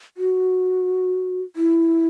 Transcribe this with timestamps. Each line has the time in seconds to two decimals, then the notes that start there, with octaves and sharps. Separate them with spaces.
0.17 F#4
1.56 E4